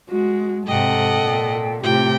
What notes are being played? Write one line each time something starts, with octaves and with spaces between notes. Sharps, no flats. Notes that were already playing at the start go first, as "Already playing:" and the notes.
G#3 F#4
G#2 C3 A4 D#5 F#5 G5
A#2
A2 C3 F4 G4 G5